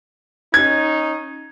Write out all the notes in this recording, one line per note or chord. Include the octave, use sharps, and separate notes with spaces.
C#4 D#4 G#6